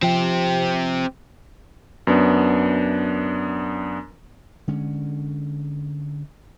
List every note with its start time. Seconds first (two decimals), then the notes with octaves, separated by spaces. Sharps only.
0.02 F3 C4 G4
2.07 F#2 B3 D4
4.68 D3 G#3 C#4